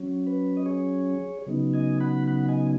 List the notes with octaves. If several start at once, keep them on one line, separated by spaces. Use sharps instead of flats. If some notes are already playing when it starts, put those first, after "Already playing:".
Already playing: F#3 C#4
B4
D#5
G#4 C#5
C#3 F#3 B3 D#4
D#5 G#5
F#5 B5
F#5 B5
D#5 G#5